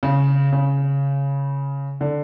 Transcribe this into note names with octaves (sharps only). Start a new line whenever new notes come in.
C#3
C#3
D3